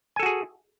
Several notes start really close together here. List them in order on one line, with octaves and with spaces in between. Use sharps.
G#5 A4 F#4 G#4